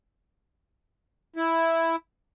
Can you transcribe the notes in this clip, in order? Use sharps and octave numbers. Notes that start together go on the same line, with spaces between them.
E4